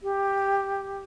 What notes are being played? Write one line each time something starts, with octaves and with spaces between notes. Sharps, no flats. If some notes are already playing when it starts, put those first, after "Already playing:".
G4